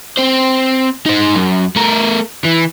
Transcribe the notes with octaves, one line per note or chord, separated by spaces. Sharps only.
C4 C5
D#4 C5
F#2
A3 A#4
E3